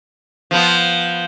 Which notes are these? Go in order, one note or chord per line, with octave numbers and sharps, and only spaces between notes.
F3 B3